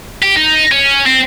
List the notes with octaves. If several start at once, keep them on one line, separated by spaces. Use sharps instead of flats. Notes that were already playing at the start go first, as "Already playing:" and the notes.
G4
D#4
C#4
C4